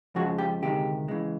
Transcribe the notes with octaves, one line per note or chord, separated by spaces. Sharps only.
F2 C#3 F3 G#3 F#4
G4
D2 C3 D#3 G#3 G4
E2 C#3 E3 G#3